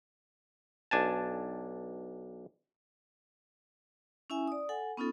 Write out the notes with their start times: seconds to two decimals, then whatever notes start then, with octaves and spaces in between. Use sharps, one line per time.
0.91 B1 D4 G#5 A5
4.30 C#4 E4 E5 G#5
4.48 D5 D#6
4.69 A4 F#5 G#5
4.97 B3 C#4 D#4 F4 A4